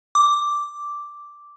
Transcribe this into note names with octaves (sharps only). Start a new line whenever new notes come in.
D6